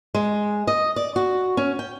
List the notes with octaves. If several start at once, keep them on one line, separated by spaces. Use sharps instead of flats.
G#3
D#5
D5
F#4
C#4
G5